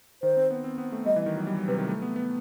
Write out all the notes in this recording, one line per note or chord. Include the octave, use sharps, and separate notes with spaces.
D#3 C5
C4
B3
C4
B3
A3
G3 D#5
E3
D#3
F#3
G3
F#3
C3 B4
D#3
A3
B3
B3